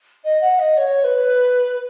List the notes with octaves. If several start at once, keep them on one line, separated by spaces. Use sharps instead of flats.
D#5
F#5
D#5
C#5
B4